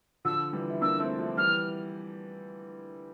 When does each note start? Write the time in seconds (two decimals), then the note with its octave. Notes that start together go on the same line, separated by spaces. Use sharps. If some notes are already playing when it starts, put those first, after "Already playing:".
0.25 D3 F3 E6
0.53 E3 G3
0.70 E4
0.81 A#3 D4 E6
1.00 A3 C4
1.19 F3 A3
1.37 E3 G3 F6